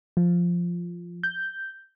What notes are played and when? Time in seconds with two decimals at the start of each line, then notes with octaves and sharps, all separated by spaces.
0.17 F3
1.23 G6